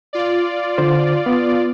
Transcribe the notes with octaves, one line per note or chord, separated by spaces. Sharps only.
F4 D5
D3 C5
B3